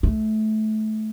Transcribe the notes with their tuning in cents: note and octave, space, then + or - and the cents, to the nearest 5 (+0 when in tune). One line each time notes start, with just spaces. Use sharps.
A3 -20